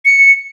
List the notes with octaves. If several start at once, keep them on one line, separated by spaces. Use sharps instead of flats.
C#7